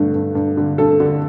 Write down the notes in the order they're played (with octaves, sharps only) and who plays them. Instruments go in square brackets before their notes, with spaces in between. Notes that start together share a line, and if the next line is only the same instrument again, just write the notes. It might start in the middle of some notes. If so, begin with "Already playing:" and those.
Already playing: [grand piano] G2 D3 A3
G2
G2
D3
G2 A4
D3